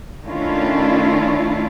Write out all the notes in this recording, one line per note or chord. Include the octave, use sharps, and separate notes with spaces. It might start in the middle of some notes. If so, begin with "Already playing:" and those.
D#3 A3 C#4 D4 E4 F4